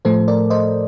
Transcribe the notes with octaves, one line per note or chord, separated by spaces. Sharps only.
A2 F3 A3 A4 C5
A#4 D5
C5 D#5